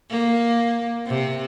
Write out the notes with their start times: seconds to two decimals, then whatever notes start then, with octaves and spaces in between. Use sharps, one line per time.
0.10 A#3
1.06 C3